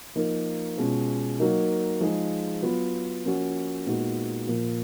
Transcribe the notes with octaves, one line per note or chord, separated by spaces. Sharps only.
F3 A#3 D#4 A#4
B2 G#3 C#4 F4
F#3 A#3 D#4 A#4
F3 G#3 D#4 G#4
F#3 B3 F4
F3 A#3 C#4 F#4
A#2 G#3 B3 D#4 F#4
A#2 F3 A#3